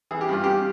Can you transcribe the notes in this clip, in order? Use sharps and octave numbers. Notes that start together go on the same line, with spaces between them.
E3 G#4
G4
G2 F4
G2 G4